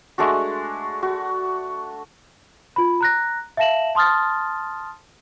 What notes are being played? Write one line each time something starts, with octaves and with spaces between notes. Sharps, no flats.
G#3 A3 D4 F#4
F#4
F4 B5
A#5 F#6 A#6
E5 F5 A5 A#6 E7 F#7
A5 C6 D#6 F6 A6